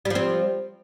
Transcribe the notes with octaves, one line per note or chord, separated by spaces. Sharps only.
F3 G3 C4